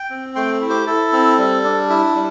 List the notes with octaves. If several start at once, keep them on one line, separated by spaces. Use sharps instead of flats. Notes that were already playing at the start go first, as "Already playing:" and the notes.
Already playing: G5
C4
A3 G5 C6
E4
G4 C5
E4 A4
C4
G3
D4
E4
G3